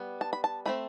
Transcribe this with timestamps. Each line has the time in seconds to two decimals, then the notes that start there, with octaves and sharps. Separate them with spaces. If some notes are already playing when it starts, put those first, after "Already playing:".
Already playing: G3 B3
0.21 A5
0.33 B5
0.44 A5
0.66 E3 A3 C4 B5